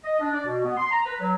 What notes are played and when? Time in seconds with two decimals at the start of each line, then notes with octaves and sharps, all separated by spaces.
0.04 D#5
0.20 D4
0.33 D5
0.45 B2
0.64 B3
0.77 C6
0.91 A#5
1.06 B4
1.20 F#3